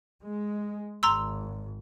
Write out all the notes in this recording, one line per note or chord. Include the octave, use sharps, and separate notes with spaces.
G#3
G#1 A#5 C6 E6